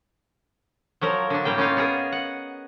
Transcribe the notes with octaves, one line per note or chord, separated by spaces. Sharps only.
F3 F#3 A#4
D3 D4
A2 G3 A#3 G5
C#4 D#4 F4 F5
B3 G#4 A#4
F#5